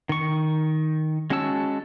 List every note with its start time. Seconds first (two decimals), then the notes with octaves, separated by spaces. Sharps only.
0.09 D#3 C#6
1.30 G#3 C#4 F#4 A5 E6